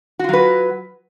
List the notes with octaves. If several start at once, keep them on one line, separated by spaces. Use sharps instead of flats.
F#3 F4 F#4 B4